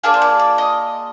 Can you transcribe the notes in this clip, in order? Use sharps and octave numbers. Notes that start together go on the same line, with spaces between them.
A#3 D4 F4 G#4 D5
C5
D5
D5
D#5